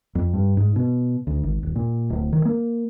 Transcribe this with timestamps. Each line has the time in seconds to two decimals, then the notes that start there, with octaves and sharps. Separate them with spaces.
0.15 F2
0.33 G2
0.57 G#2
0.76 B2
1.27 D2
1.44 G#1
1.63 D#1
1.76 A#2
2.10 D1
2.33 D#3
2.45 A#3